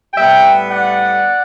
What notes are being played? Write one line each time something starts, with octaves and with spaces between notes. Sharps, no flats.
A2 G3 B3 E5 G5
D5 F#5